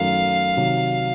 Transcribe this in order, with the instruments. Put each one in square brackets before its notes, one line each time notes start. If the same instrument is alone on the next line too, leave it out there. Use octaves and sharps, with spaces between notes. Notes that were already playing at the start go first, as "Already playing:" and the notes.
Already playing: [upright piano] F#2 D#3 F#3 A3 [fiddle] F5
[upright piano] C3 D#3 F#3